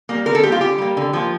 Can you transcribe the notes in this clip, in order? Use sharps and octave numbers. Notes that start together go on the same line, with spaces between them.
G3 A#3
D3 A#4
A4
G3 A#3 G4
F4
D3 G4
G3 A#3
D3
F3 A#3